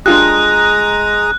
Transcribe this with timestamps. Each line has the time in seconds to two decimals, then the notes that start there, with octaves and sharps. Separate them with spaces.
0.06 G#3 D4 F4 G4 A#5 D#6 F#6